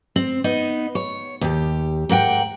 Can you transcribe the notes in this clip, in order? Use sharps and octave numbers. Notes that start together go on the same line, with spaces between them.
C4
B3 D#4 D#5
C#5
D#2 G4
G#2 A#4 F#5 G5